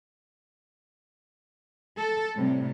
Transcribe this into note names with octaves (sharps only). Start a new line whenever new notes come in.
A4
A2 C3 G3